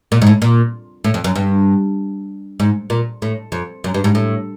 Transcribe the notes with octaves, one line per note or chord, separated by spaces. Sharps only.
A#2
G#2
A2
A#2
A2
F2
F#2
G2
G#2
A#2
A2
F2
F#2
G2
G#2
A2